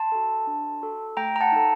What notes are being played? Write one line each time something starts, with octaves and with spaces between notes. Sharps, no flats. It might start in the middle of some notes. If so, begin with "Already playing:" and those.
Already playing: A5 C6
F#4 A4
D4
F#4 A4
A3 G5 A#5
A#5
F#5 A5
D#4 A4